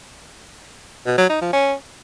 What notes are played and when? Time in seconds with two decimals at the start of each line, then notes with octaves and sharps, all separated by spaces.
1.06 B2
1.18 F#3
1.30 D#4
1.41 F3
1.53 C#4